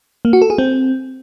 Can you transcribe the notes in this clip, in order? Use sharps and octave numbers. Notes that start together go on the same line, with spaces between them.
A#3
F#4
A4
G#4
C4